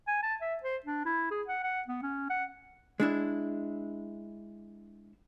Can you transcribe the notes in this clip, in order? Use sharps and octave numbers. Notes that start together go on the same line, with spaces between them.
G#5
A5
E5
C5
D4
E4
G#4
F#5
F#5
B3
C#4
F#5
G#3 D4 E4